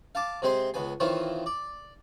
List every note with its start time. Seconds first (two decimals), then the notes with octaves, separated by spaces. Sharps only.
0.15 F5 A5 D6
0.42 C3 G#3 C4 C5 C6
0.74 C#2 B3 G#5
1.00 D#3 E3 C4 E4 F4 C#5
1.46 D5